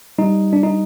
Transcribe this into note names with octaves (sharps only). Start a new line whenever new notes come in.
G3 D#4
D4
D#4